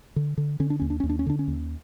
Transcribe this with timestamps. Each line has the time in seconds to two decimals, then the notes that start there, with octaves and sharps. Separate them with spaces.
0.16 D3
0.38 D3
0.60 D3 C#4
0.70 D4
0.80 D#2 C#4
0.90 D4
1.00 D#2 C#4
1.09 D4
1.19 C#4
1.26 D3 D4
1.39 C#4
1.48 D#2